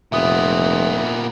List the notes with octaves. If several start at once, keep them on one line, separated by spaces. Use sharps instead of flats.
F1 A#2 B3 E5 D#6